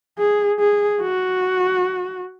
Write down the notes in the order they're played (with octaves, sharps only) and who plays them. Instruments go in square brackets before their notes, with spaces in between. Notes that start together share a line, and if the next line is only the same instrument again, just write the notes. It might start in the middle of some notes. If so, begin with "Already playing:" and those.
[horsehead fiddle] G#4
G#4
F#4